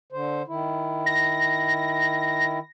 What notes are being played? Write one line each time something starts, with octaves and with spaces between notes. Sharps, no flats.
D3 C5
D#3 E4
A#6